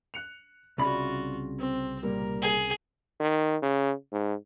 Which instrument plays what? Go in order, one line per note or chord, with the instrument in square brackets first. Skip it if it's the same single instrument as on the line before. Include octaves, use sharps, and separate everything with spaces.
[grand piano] F#6 C#7 F7
[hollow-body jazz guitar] C2 C#3 B5 [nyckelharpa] F4 F#4 [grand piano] D5
[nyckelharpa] C4
[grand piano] A#2 G3 A#3 [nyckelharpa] A#4
[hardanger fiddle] G#4
[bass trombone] D#3
C#3
G#2